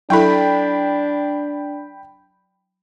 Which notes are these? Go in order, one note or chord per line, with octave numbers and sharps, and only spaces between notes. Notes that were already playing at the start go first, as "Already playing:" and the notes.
F#3 D4 E4 A4 G5 B5